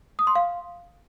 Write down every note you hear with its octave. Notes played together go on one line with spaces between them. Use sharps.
D#6
C6
F5